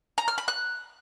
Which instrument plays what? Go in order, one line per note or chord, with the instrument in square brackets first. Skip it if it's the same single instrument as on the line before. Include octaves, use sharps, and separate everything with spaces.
[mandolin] A#5
F6
B5
F#6